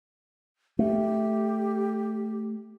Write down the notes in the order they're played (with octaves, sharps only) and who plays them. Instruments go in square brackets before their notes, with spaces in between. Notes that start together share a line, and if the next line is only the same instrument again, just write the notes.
[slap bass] A3 [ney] G4